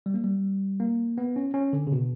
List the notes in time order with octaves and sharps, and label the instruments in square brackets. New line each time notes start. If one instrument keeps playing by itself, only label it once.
[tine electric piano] G3
A#3
G3
A#3
B3
C#4
C#4
D3
C#3
B2